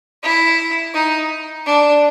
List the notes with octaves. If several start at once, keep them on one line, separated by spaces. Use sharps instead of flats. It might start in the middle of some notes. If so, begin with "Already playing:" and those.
E4
D#4
D4